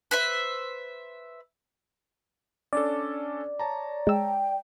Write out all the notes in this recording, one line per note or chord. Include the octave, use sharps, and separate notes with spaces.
B4 C5 E5
C#4 D4 A4 D5
C#5 A5 A#5
G#3 G5 E6